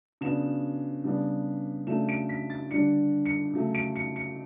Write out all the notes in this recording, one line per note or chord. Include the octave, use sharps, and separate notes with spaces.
C#3 F#3 B3 D4 E7
C#3 G3 B3 D4
C#3 F#3 A3 D4 E7
D7
B6
A6
D3 G3 D4 C#7
C#7
C#3 F#3 A3
D7
C#7
C#7